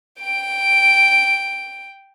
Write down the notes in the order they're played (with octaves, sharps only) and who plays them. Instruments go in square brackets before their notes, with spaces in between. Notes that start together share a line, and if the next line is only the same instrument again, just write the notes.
[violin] G5 D7